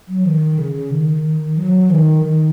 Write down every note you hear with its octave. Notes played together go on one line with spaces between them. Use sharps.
F#3
D#3
C#3
D#3
F#3
D#3
D#3